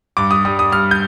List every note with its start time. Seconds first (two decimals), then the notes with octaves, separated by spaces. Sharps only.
0.17 G2 D6
0.31 D#6
0.45 G3 D#6
0.59 D#6
0.72 G2 F6
0.91 G6